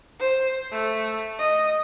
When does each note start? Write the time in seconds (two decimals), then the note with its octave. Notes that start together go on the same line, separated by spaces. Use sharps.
0.20 C5
0.72 A3
1.39 D#5